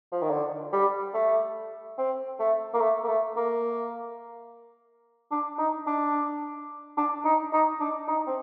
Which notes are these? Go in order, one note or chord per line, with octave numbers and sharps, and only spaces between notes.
F3
D#3
D3
G3
A3
C4
A3
A#3
A3
A#3
A3
A#3
D4
D#4
D4
D4
D#4
D#4
D4
D#4
C4